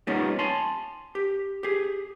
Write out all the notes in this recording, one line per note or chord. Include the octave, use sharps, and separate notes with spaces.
G3 A#3 B3 C#4 D#4 F4
G#5 A5 C6
G4
G4 G#4